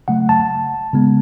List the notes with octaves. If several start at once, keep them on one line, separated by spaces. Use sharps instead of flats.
C#3 F#3 A3 F#5
A5
C#3 G#3 B3